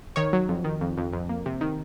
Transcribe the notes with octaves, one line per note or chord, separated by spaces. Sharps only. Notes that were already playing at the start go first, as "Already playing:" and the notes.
D#3 C#5
F#3
F2
D#3
F2
F2
F2
A#3
C3
D#3